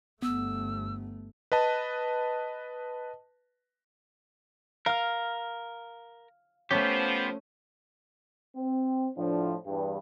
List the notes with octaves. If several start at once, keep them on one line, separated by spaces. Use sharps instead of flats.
G1 A3 B3 E6
B4 D#5 A5
A#4 F5 F6
F3 A3 B3 C#4 G4 C5
C4
A2 F3 D4
E2 G2